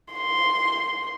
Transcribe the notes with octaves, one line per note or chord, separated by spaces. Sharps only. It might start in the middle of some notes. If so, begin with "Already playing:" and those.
C6